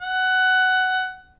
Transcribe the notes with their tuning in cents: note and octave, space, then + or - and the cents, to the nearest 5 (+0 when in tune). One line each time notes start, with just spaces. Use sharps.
F#5 +15